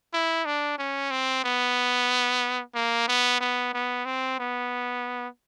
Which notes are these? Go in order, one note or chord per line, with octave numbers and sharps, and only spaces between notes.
E4
D4
C#4
C4
B3
A#3
B3
B3
B3
C4
B3